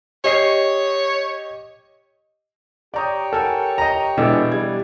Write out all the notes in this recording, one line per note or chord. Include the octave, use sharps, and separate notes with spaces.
G4 C#5 D#5 C7
G4 C#5 D5 G5 A#5 D#6
A4 A#4 F#5 G#5
D#5 A#5
B2 E3 G#3 D4 A4 E6
G3 G#6